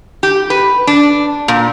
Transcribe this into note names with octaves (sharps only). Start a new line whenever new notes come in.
G4
B4
D4
A#2